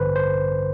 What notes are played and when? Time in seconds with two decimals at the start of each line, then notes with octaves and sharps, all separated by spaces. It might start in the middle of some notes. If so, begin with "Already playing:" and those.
Already playing: A1 G2 D3 B4 C5
0.16 C5